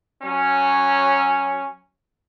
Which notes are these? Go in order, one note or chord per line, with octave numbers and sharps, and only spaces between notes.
F#3 C#4